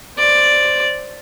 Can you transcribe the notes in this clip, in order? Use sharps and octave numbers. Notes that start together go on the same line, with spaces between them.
C5 D5